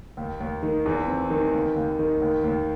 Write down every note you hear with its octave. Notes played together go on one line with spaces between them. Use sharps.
D#2
D#2
D#3
E2
C4
D#3
D#2
D#2
D#3
D#2
D#2